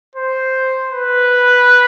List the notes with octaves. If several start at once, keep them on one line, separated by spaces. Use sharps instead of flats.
C5
B4